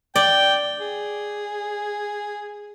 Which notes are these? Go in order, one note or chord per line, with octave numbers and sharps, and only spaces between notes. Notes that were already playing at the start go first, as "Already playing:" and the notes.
D5 G5
G#4